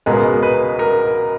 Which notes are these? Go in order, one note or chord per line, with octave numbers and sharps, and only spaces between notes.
C#2 B2 G#3 B3 A#4
B4
A#4